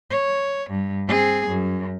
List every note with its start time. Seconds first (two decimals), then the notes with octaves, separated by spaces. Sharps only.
0.10 C#5
0.70 G2
1.08 C4 G#4
1.47 F#2